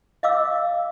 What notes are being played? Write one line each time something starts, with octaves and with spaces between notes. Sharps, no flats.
D#5 F5 D6 E6